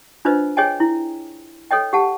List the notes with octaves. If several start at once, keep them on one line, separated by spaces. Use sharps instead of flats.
D4 F4 B4 C5 D#5
G#4 C#5 D#5 G5 G#5
E4
A4 C#5 D#5 G5
G4 F#5 A5